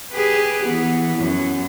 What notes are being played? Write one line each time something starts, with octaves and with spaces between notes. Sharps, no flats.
G4 G#4 B4
E3 B3
F#2